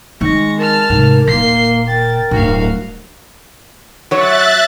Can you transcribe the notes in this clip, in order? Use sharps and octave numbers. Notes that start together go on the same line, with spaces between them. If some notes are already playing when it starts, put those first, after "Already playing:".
D#3 G#3 C4 C#6 A#6
A#4 A5 F6
G#2 C3
D#1 A#2 A#3 C6 C7
A#4 G5 A6
D1 G2 F#4 F5
F#3 C#5 E5 F#6 A6